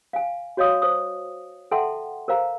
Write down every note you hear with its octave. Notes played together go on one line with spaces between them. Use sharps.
F5 G#5
F#4 C#5 D#5 F5 D#6
C5 D#6
A4 E5 F#5 G5 A5 C6
A#4 C5 F5 A#5